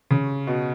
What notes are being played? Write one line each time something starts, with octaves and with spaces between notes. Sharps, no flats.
C#3
B2